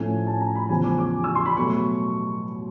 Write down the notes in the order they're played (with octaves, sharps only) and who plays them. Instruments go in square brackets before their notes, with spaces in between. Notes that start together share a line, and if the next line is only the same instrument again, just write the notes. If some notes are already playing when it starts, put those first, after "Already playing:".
Already playing: [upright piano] A2 F3 A3 C#4 G#5
A5
A#5
B5
E2 C#3 F3 G#5
D6
D6
E6
C6
B5
B2 F#3 A3 C#6